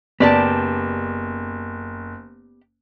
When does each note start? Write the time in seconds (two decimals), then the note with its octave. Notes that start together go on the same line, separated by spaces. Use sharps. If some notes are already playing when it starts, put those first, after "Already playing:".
0.20 F#1 B3 G4 D5 A5